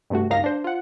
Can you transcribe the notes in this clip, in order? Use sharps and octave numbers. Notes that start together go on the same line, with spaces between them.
G2 C3 A3 F#4
C#2 G2 A#3 D#4 F5 A#6
D4 C5
F4 F#5